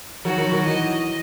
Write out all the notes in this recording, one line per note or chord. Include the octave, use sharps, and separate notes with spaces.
D#3 F#3 F#4
D#3 F#3
D#3 F#3
E3 D#5